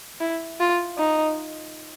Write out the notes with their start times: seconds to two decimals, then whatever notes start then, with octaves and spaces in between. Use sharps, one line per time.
0.20 E4
0.60 F4
0.98 D#4